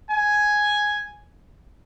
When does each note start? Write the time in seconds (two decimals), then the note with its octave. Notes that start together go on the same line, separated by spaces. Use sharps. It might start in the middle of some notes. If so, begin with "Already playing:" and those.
0.11 G#5